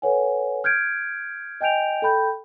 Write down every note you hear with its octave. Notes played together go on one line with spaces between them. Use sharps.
A4 B4 C#5 F#5 G#5
F6 G6 G#6 D7
D#5 G5 G#5 G6 D7 F7
A4 G5 B5 G6